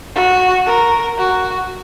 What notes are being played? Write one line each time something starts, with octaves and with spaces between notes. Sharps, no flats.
F#4
A#4
F#4